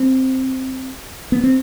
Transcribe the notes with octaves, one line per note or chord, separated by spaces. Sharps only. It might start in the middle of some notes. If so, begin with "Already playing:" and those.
Already playing: C4
B3
C4